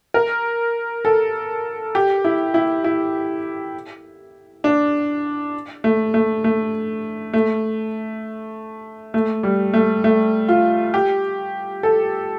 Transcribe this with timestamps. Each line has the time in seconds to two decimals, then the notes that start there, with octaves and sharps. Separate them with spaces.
0.14 A#4
1.05 A4
1.95 G4
2.25 E4
2.54 E4
2.84 E4
4.64 D4
5.84 A3
6.14 A3
6.44 A3
7.33 A3
9.14 A3
9.43 G3
9.74 A3
10.04 A3
10.48 F4
10.94 G4
11.83 A4